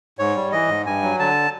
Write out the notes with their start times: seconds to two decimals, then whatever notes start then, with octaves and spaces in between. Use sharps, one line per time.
0.19 G#2 C#5
0.36 G3
0.52 E3 D#5
0.68 G#2
0.85 G2 G#5
1.02 F#3
1.19 D3 A5